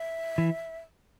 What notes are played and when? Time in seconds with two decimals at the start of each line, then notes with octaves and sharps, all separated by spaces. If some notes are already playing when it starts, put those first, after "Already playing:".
Already playing: E5
0.38 E3